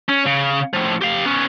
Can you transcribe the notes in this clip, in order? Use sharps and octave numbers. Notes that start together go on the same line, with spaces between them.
C#4
C#3
A2 F3
G4 F5
B3 C#4